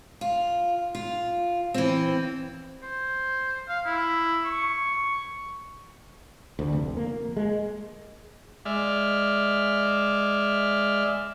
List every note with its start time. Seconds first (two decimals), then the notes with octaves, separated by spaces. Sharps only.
0.21 F4
0.95 F4
1.74 E3 C4
2.83 C5
3.68 F5
3.86 E4
4.45 C#6
6.59 D2
6.72 F1
6.97 A#3
7.37 G#3
8.65 G#3 D5 E5 F6